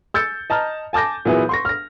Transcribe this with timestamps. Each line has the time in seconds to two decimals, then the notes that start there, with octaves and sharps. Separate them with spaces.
0.14 E6 G6 A6 C#7
0.50 D#5 A5 A#5 F6
0.93 G#5 A5 D6 G6 A#6
1.25 A#2 E3 F#3 B3 E4 G#4
1.49 C6 C#6 A#6
1.65 F6 A#6